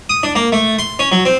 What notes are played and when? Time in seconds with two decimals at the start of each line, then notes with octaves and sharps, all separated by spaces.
0.09 D#6
0.23 D4
0.35 A#3
0.52 A3
0.79 C6
0.99 C#4
1.12 F#3
1.25 C4